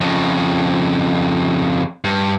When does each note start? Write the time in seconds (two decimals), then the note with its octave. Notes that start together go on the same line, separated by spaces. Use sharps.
0.01 F2 C#3
2.04 G2